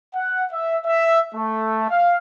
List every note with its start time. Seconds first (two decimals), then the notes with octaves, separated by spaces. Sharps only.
0.14 F#5
0.52 E5
0.85 E5
1.34 A3
1.90 F5